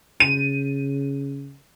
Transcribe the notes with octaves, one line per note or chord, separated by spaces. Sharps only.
C#3 D#7